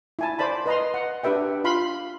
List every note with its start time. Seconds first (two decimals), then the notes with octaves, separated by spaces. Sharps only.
0.19 E4 G#5 A5
0.39 C5 D5 A5 B5
0.66 B4 D#5 A#5 C6
0.94 F#5
1.23 D4 G4 B4 E5 G5
1.64 F4 F5 B5 C6